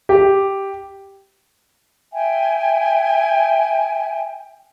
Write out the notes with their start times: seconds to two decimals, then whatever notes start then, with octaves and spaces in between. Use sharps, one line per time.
0.09 G4
2.11 E5 G5 G#5